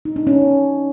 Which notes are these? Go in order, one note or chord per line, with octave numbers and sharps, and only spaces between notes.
D#4
D4
C#4